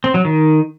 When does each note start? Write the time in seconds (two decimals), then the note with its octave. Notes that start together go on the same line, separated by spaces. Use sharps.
0.04 C4
0.14 F#3
0.25 D#3